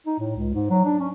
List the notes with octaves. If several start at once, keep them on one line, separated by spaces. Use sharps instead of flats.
D#4
A2
C#2
G#2
F#3
D4
C#4